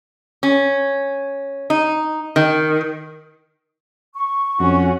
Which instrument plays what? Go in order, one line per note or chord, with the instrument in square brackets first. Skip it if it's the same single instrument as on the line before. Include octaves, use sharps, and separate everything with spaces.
[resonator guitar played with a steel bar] C#4
D#4
D#3
[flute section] C#6
[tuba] F2 [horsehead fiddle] C#4 F#4